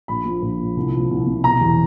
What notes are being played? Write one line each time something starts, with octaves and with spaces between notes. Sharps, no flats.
A#1 B5
F3
A#1
A#2
C2
F3
C2
C3
B2 A#5
E2